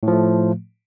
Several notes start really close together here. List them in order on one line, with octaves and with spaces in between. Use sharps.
A2 F3 A3